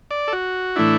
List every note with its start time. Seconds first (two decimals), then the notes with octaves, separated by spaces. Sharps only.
0.11 D5
0.28 A4
0.33 F#4
0.76 A2 E3 A3 D4 E4